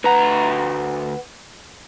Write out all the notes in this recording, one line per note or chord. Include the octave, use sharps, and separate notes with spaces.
D2 B4 F#5 A#5